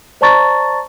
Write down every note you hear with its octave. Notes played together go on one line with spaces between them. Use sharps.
C5 D5 A5 A#5 C#6 A6